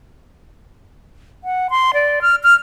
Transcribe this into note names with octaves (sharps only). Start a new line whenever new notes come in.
F#5
C6
D5
F6
F6